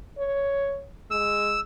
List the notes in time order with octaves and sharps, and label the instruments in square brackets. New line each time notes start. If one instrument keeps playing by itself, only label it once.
[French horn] C#5
[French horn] G#3 [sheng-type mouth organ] E6